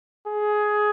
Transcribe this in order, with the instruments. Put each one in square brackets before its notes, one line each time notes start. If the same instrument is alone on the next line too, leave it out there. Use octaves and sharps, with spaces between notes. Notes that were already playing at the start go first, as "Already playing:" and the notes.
[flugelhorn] G#4